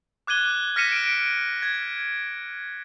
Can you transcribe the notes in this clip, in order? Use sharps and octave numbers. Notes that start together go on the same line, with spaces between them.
D6 F#6 G#6 D#7 G7
F6 A#6 B6 C#7 D#7 E7
D7
G#6